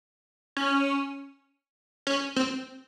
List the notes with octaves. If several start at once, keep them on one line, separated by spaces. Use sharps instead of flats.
C#4
C#4
C4